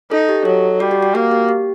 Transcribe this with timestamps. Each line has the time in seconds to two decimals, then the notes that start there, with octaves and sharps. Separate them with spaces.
0.11 D#4 A4
0.29 G4
0.45 F#3 A4
0.80 G3 F#4
0.91 G4
1.03 F#4
1.14 A#3 F#4
1.31 G4
1.49 G4